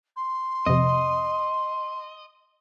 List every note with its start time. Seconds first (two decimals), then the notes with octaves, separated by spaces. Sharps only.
0.16 C6
0.66 F2 C3 D#5